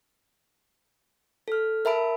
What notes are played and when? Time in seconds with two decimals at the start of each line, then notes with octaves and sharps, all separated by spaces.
1.48 A4 F6
1.85 A#4 E5 A5 B5 D7